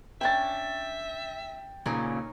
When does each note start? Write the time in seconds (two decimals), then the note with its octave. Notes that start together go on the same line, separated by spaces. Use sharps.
0.21 C#4 D4 E5 G5 A6
1.86 A#2 C#3 C#4 D#4 A#4